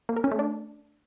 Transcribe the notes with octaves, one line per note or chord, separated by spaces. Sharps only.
A#3
A#4
C#4
A3
D4